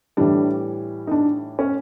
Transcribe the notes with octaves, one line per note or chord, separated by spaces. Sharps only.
A2 E3 G3 D4
D#4
D4
C#4